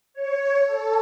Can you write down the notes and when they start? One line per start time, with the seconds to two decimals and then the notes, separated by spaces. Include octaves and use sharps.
0.14 C#5
0.65 A4